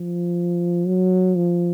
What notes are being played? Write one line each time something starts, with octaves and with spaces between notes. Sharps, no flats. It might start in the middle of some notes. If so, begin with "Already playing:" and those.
Already playing: F3
F#3
F3